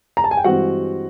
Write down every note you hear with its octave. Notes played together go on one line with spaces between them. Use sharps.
A#5
A5
G#5
G5
G2 E3 G#3 C4 F#4 F#5